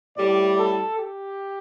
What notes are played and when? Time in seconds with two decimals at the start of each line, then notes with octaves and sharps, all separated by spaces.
0.16 A2 G3 D5
0.57 A4
0.97 G4